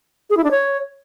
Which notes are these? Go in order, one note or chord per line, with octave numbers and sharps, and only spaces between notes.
G#4
E4
D4
C#5